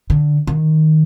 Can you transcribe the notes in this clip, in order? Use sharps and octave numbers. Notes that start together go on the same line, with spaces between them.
D3
D#3